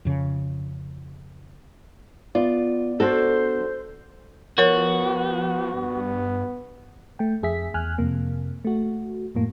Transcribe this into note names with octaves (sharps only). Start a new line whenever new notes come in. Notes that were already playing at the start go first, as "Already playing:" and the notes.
F2 C#3
B3 F4 D5
D4 F#4 A4 C5
F3 B3 F#4 A#4 C#5
G2 B3
A3 G5
F2 G#4 E5 B6
E2 G#5 F6 F#6
F2 C3 A#3
A3 F#4
F2 A2 A#3